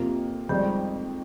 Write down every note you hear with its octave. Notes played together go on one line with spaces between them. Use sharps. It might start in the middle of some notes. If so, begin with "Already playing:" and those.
Already playing: F2 C3 F3 A#3 F4
F2 D#3 G3 G#3 C4